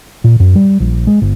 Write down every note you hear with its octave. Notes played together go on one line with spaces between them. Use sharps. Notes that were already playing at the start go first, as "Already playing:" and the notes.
A#2
F#2
G3
A#1
G#3
G1